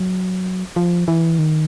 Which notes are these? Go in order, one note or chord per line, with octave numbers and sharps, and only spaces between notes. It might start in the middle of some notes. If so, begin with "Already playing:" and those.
Already playing: F#3
F3
E3
D#3